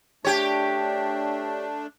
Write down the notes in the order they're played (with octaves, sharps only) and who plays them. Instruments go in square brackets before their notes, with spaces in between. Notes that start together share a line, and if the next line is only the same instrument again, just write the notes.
[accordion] A3 D4 [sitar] G4 C#5